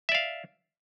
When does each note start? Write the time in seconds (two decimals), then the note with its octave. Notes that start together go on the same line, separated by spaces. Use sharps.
0.09 E5
0.12 D5
0.15 F5